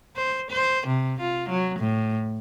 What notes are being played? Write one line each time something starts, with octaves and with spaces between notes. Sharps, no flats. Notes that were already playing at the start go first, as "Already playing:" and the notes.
C5
C5
C3
F4
F#3
A2